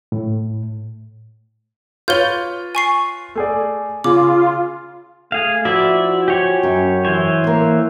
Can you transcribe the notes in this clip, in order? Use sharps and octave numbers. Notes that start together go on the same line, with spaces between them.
A2
F4 B4 C#5 G6 G7
G#5 C#6 C7
A3 G#4 D5
C#3 F4 D6
A3 G#4 F5
F3 E4 F#4 D5 E5
G4 C#5 G#5
F#2
E3 C5 C#5
A#3 C4